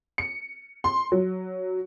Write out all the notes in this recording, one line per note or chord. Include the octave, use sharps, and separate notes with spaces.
C#7
C6
F#3